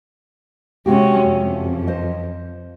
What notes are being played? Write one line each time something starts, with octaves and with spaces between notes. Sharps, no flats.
C3 G#3 C#4 F#4 G4
F2
C5 D#5